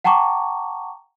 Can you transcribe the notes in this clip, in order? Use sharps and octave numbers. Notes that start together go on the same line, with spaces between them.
F#5 G5 A5 A#5 C#6 D6